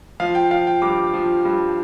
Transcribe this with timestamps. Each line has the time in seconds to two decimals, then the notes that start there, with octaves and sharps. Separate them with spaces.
0.20 F3 F5
0.35 G5
0.51 F3 F5
0.67 G5
0.82 G2 D6
1.13 F3
1.45 G2